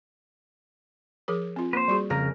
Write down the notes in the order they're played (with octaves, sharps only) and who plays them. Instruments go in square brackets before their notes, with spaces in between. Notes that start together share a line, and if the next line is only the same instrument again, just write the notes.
[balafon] F3 G#4 A#4
C4 F4
[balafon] A#3 [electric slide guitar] B4 C5
[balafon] G3 F#4 G#4
[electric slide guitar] F2 C#3 A#4 [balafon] A#5